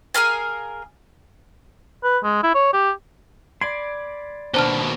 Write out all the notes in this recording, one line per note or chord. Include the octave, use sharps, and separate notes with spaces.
G#4 A#4 F5 G#5
B4
G#3
E4
C#5
G4
D5 B5 C6 G#6 D7
D#2 B2 B3 D4 C5 A5 F6